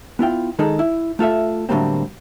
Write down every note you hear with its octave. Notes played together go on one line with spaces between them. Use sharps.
B3 E4 F4 G5
D#3 G#3 D#4 G#4 A4
E4
A3 F4 A4 E5
A2 D3 F#3 G3 A#3 C4